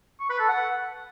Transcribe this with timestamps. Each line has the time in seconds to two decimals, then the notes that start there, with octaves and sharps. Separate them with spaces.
0.20 C#6
0.30 B4
0.39 A4
0.49 F#5